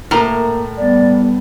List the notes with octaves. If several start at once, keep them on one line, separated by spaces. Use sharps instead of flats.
A2 A#3 A#4 A#5 F6
G3 B3 D5